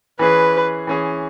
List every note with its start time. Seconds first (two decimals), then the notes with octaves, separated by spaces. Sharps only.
0.19 E3 C#4 G#4 B4
0.87 E3 C#4 G#4